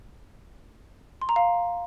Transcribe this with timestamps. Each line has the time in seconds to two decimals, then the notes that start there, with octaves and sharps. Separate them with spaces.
1.22 C6
1.29 A#5
1.36 F5